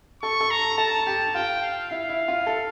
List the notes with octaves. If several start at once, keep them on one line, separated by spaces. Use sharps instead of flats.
A4 C#6
A4
A#5
A4 A5
G4
F4 G5
F5
E4 F5
E4
F4
A4